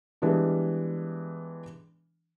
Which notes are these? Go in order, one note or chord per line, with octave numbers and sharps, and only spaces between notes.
E3 G3 G#3 B3 D4